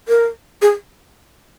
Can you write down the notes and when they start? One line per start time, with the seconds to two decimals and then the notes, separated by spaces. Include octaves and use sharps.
0.08 A#4
0.62 G#4